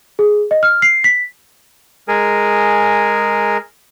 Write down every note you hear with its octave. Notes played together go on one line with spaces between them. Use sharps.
G#4
D#5
F6
C7
B6
G#3 G#4 A#4 G#5